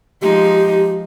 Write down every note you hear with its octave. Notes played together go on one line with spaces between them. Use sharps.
F3 G#3 D#4 G4